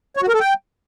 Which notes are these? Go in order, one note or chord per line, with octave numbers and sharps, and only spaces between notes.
C#5
F#4
A#4
A4
G5